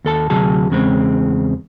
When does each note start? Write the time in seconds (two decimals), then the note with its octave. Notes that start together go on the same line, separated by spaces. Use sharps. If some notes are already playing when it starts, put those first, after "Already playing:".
0.05 D#2 A4 A5
0.30 D2 C3 F#3 G#4 A5
0.70 E2 C#3 G#3 C4